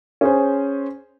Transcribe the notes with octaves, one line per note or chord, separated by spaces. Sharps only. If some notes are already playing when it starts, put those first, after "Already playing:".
C#4 G#4 C5